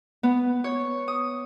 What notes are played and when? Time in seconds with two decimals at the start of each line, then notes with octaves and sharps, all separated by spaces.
0.23 B3
0.64 C#5
1.08 D#6